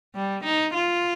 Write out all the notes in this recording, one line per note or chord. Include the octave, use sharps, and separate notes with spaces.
G3
D#4
F4